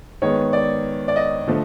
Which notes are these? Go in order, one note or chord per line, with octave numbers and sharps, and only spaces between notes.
D#3 G#3 B3 C#5
D5
D5
D#5
D3 F3 A3